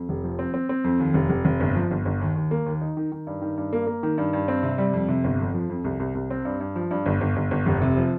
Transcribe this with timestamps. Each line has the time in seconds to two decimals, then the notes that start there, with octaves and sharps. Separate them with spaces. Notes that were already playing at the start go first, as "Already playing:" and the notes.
Already playing: F2
0.09 F1
0.24 F3
0.39 C4
0.54 C4
0.69 C4
0.84 F2
0.99 D#2
1.14 F1
1.30 F1
1.45 F1
1.60 G1
1.76 F3
1.91 G1
2.05 G1
2.21 D#2
2.36 D#2
2.51 A#3
2.66 D#2
2.81 D#4
2.97 D#3
3.12 D#3
3.27 G2
3.42 D#3
3.58 G2
3.73 A#3
3.87 A#3
4.03 D#3
4.18 G2
4.33 G2
4.48 C4
4.63 C3
4.78 G3
4.93 F2
5.09 C3
5.24 G1
5.40 F2
5.54 F3
5.70 F2
5.84 C2
6.00 C2
6.15 C2
6.30 C4
6.45 G2
6.60 G2
6.76 F3
6.91 G2
7.06 G1
7.21 G1
7.36 G1
7.51 G1
7.66 F1
7.82 C3
7.97 F3